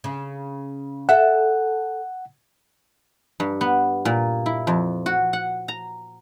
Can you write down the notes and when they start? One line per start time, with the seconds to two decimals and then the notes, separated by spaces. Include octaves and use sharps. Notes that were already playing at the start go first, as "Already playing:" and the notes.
0.04 C#3
1.09 A4 E5 F#5
3.40 G2
3.61 B3
4.05 A#2
4.46 E4
4.67 F2
5.06 F#4
5.33 F#5
5.68 A#5